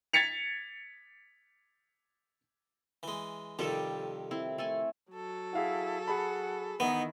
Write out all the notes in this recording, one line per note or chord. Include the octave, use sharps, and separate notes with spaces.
G#6 A6 B6 C#7 F7
E3 G#3
F2 C3 D#3 G3 A4
C4 E4
A3 A4 G#5
F#3 A4
E4 G#4 F5 F#5
G#4 F#5 A5 B5
D#3 E3 B3 D#4 E4